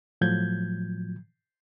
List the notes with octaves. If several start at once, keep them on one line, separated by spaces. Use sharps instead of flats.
A2 F3 F#3 G6 G#6